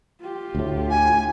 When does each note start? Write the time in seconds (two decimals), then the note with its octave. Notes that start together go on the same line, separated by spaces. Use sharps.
0.21 F4 G4
0.55 D2 A2
0.90 G#5